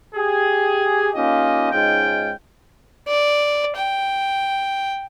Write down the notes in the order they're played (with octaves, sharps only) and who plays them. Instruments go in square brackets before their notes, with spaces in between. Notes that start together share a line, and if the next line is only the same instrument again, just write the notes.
[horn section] G4 G#4
A#3 C#4 D#4 F4 G4 D#5
G#2 G#3 C#4 D#4 F4 G5
[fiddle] D5
G5